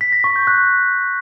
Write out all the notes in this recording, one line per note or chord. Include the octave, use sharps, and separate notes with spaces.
B6
A#6
C#6
G6
F#6